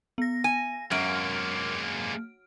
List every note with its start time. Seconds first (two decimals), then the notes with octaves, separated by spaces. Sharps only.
0.18 B3 A#6
0.44 G#5
0.91 F#2 G#3 A#3 F6 D7